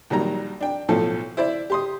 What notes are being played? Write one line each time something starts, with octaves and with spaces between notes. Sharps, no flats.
A#1 D#3 F#3 G3 A#5
D4 G5
B1 A2 F3 A4
E4 C5 D5 E5
G4 C6 D#6